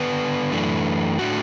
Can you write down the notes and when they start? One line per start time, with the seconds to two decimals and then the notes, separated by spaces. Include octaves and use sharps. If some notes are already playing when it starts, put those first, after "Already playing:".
Already playing: D3 B3 D4 B4
0.52 F#2 E3 A3 D4
1.18 A2 A3 D4 F#4